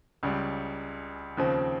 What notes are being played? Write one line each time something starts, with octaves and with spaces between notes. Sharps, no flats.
C#2 C#3 G3
D#2 C#3 F3 C4